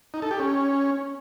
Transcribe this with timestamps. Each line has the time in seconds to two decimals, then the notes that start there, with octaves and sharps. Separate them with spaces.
0.14 D#4
0.22 A4
0.31 G4
0.39 C#4